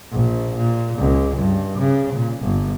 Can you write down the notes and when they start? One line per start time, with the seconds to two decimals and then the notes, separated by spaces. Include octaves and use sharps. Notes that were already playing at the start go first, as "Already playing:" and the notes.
0.12 A#1
0.57 A#2
0.99 C#2
1.38 G2
1.79 C#3
2.14 A#2
2.42 G1